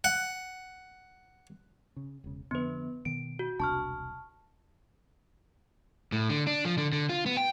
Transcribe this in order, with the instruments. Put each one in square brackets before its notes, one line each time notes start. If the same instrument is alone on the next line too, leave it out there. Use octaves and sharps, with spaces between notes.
[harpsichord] F#5
[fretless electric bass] C#3
E1 C#3
[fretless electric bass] F2 D3 [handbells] B3 B4
[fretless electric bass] B2 D#3 B3 [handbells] D7
[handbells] F#4
[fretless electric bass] E1 C2 D4 [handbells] A5 C#6 F6
[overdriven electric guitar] A2
D3
D4
F3
D3
D3
F4
B3
G5